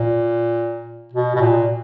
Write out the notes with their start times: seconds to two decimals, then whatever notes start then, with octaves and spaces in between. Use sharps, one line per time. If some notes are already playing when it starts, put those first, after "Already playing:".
Already playing: A#2
1.13 B2
1.36 B2
1.41 A#2